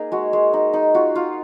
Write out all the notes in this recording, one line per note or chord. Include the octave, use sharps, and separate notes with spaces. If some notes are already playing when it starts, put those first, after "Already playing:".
Already playing: A#3 D#4 G#4 A#4
G#3 F#4
G#3
D#4
D#4
F4 F#4
F4